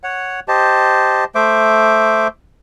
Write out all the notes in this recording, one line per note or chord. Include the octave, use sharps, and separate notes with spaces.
C#5 F#5
G4 C5 D#5 A5
A3 C5 E5 D6